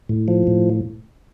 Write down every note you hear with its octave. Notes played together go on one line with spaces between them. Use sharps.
A2
F3
A2